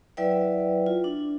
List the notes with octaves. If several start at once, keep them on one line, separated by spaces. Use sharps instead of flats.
F#3 E4 B4 D5 E5 G5
F4
D4